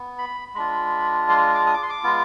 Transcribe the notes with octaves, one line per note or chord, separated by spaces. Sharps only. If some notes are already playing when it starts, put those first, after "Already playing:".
Already playing: B3
B5
G#3 D4 F4 B5
C6
D6
D#6
D6
C6
D6
G#3 B3 F4